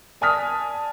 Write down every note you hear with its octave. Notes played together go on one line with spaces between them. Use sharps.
D5 G#5 A5 D#6 F6 B6